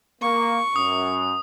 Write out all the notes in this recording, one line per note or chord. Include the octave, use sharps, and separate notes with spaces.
A#3 C#6
F#2 D#6